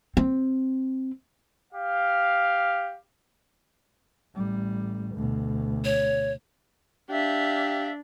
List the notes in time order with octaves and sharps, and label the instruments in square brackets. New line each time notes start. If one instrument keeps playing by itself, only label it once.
[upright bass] C4
[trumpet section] G4 F5
[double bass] A1 G3
D2 B2
[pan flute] C#5
[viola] D4 [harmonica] G4 [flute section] E5 [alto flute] F5